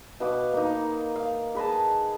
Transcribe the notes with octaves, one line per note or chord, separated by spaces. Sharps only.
B2 B4 F5 D6
A#3 D#4
F5
G#4 B4 D#5 A5